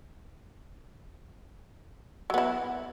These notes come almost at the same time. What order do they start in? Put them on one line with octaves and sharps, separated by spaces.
F#3 B3 E4